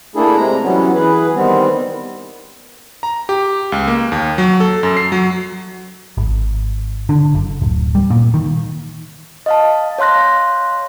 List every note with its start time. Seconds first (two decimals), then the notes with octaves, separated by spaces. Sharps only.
0.16 A3 A#3 D4 E4 G#4 A4
0.36 C3 G#3 A#5
0.64 E3 F#3 G3 B3 C#4
0.95 E3 G#4 B4
1.35 D#3 G3 B3 C4
3.03 A#5
3.29 G4
3.72 C#2
3.88 A#3
4.12 D#2
4.38 F#3
4.60 A4
4.83 F#2
4.97 C7
5.12 F#3
6.17 G#1
7.09 D3
7.34 F#1
7.62 D1
7.95 G3
8.10 A#2
8.34 D#3
9.46 D#5 F5 A5
9.98 C#5 F5 C6 F#6 A#6